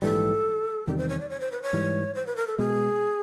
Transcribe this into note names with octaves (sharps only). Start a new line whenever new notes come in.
A#1 G#2 E3 G3 A4
E2 C3 D#3 G3 G4
C5
C#5
D5
C#5
C5
B4
C#5
G#2 E3 G3
C5
B4
A#4
A4
B2 G#3 G#4